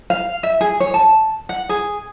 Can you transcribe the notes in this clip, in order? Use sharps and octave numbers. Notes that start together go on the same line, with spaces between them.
F5
E5
G#4
C#5
A5
F#5
G#4